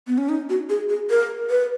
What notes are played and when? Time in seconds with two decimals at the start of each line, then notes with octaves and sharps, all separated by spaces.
0.07 B3
0.18 C#4
0.29 D#4
0.50 F#4
0.70 G#4
0.89 G#4
1.10 A#4
1.50 B4